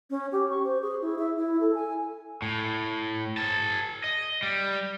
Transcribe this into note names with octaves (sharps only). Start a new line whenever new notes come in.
C#4
G4
C#6
C5
G#4
E4
E5
E4
A4
G#5
A2
G#4 A5
D#5
G3